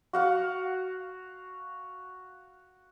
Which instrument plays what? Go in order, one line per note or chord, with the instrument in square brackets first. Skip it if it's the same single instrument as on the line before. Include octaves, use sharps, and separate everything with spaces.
[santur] F#4 F5 F#5